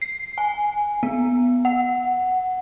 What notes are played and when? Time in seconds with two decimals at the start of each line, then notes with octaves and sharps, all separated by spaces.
0.02 C7
0.38 G#5
1.03 B3
1.65 F#5